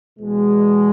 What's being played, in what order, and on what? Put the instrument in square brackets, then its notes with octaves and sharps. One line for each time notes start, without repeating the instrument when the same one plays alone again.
[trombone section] E2 B2 G#3